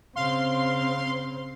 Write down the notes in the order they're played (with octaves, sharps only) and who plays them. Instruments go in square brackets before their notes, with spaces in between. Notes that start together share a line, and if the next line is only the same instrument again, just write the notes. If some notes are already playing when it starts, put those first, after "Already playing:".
[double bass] C#3 C4 [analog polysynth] F5 C6